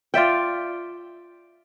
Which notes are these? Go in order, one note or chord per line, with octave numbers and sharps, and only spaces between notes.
F4 D5 E5 G5